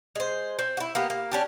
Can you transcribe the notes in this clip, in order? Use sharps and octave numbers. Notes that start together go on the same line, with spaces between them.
G#3 C5
C4
E4 F#4
A#3 B3 G4
A#3
C#4 D4 G4